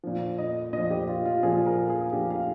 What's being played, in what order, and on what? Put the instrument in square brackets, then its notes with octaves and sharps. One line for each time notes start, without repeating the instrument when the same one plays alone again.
[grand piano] A#2 F3
D#5
A#2 F3 D#5
G4
F4
F4
A#2 F3 G#4
A#4
G#4
A#2 F3 G4
F5